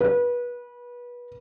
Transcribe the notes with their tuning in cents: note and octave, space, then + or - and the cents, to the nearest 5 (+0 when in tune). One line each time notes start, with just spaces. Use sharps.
B4 -25